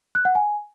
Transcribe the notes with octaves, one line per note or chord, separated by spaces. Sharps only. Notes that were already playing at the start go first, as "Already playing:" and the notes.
F#6
F#5
G#5